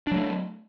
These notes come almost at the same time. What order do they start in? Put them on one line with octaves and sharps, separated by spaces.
D4 F#3 A3